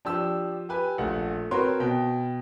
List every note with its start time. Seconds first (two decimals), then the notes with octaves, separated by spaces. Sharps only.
0.05 F3 D4 G4 E6
0.69 G4 B4 G#5
0.98 A#1 A3 F#5
1.51 C4 F#4 A#4 B4 C#5 C6
1.80 B2 G5